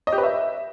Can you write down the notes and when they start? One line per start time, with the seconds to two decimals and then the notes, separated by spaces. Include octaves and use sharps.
0.07 D#5
0.13 G4
0.18 B4
0.23 E5